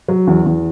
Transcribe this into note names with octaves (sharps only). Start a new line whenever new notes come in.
F#3
E2
E2